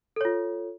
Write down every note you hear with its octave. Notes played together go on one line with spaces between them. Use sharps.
F4 A4 C#5